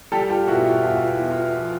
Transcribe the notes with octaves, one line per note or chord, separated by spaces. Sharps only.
G3 G4 A4
F4 G4
B2 E4 F#4
F4
E2 F4
E4
E2
F4
F3